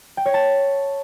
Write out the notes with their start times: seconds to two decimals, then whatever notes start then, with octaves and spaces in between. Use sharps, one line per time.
0.17 G5
0.26 C#5
0.34 A5